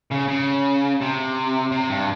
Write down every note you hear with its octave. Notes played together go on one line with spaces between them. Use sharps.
C#3
C#3
C3
C3
G2